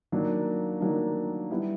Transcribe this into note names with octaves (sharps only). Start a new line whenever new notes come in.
D#3 F#3 A#3 D4
D#3 F#3 A#3 D4
G3 B3 E4